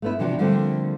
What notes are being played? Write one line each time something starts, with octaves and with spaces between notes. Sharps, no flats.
A3 B3 E4
C3 E3 F3 D4 F#4
D3 F3 G3 A3 A#3 C4